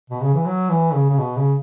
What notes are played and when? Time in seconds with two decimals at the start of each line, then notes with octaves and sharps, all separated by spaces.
0.10 B2
0.22 C#3
0.34 E3
0.45 F#3
0.70 E3
0.93 C#3
1.09 C#3
1.18 B2
1.36 C#3